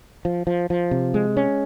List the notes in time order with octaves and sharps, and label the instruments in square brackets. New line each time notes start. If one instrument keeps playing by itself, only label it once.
[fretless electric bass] F3
F3
F3
C3
G#3
C#4